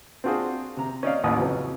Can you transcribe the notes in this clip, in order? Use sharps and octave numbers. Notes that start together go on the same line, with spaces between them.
C4 D4 F4 F#4 G#4 C5
C3 A#5
C#4 D#4 D5 F5
A1 D#2 E4 F#5 D#6
F2 C#3 E3 F#3